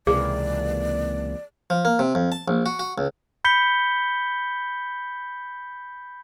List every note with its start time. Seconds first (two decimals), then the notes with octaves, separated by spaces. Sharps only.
0.07 C#2 C3 E3 A#3 G#4 D5
1.70 F3
1.85 A#3
1.99 C3
2.15 F2
2.32 A5
2.48 A#1
2.66 F#4
2.79 F#4
2.98 C#2
3.44 B5 G6 B6 C#7 G7